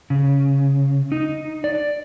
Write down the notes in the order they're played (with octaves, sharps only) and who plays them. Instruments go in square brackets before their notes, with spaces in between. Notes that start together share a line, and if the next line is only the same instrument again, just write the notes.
[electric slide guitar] C#3
D#4
D5